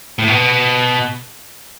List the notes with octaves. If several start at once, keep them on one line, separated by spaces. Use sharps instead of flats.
A2
B2